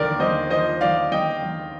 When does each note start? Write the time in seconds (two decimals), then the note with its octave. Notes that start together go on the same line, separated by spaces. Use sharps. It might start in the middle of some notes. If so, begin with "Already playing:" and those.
Already playing: D#2 D3 F3 A#4 D5
0.20 D#2 C5 D#5
0.50 F3 C5 D#5
0.81 D#2 D5 F5
1.12 D#2 D#5 G5
1.42 D#2